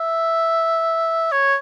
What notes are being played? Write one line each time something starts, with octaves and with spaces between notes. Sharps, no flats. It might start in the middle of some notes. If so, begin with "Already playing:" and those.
Already playing: E5
C#5